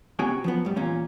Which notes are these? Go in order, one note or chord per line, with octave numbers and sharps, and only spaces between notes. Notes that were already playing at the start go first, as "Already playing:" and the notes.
C3 B3 C#4 F#4 G5 G#5
F3 F#3 B3
G#2 G3
E2 A#2 C#4 F4